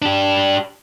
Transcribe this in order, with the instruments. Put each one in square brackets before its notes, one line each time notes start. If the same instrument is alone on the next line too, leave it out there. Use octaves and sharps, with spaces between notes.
[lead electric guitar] D4 G4